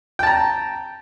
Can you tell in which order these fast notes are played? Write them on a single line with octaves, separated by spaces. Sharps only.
G5 A5 A#5